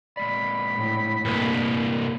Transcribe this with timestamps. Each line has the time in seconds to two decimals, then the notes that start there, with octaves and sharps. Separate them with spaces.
0.17 A#2 G#3 D5 B5
0.77 A2
1.25 C2 G2 A#3